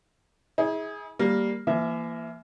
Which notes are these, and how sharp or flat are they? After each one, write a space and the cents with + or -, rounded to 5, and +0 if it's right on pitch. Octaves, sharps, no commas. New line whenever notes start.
E4 -40 G#4 +0
G3 +0 A#3 +0
E3 +40 A#3 +0 E5 +0